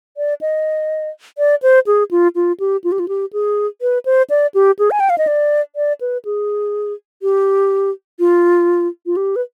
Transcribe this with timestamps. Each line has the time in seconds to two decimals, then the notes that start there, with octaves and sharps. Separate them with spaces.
0.17 D5
0.41 D#5
1.38 D5
1.62 C5
1.87 G#4
2.11 F4
2.35 F4
2.60 G4
2.84 F4
2.92 G4
2.99 F4
3.08 G4
3.33 G#4
3.82 B4
4.06 C5
4.30 D5
4.54 G4
4.79 G#4
4.91 G#5
5.00 G5
5.10 F5
5.18 D#5
5.27 D5
5.76 D5
6.01 B4
6.25 G#4
7.22 G4
8.19 F4
9.06 F4
9.17 G4
9.36 B4